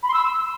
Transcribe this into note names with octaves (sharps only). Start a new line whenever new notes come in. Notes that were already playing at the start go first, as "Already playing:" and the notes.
B5
C6
E6